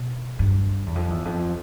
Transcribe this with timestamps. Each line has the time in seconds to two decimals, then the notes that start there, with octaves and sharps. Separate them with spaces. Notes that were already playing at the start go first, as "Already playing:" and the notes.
Already playing: B2
0.39 G2
0.86 E2
0.95 F2
1.10 E2
1.25 F2